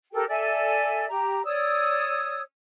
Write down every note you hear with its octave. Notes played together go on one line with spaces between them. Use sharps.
G4 A4 A#4 G5
A4 D5 E5 G#5
G4 A#5
C#5 D5 D#6 E6